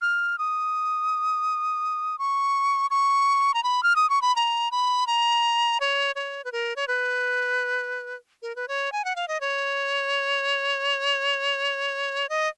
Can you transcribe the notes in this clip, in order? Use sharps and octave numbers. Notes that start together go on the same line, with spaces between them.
F6
D#6
C#6
C#6
A#5
B5
F6
D#6
C#6
B5
A#5
B5
A#5
C#5
C#5
B4
A#4
C#5
B4
A#4
B4
C#5
G#5
F#5
F5
D#5
C#5
D#5